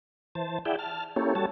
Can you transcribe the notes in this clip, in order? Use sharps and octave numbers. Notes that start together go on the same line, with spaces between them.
E3 C5 A5
E4 G#4 D5 E5 F#5 G5
A5 F6
A#3 C#4 E4 G4 A4 C#5
G3 F#4 A4 C#5 A5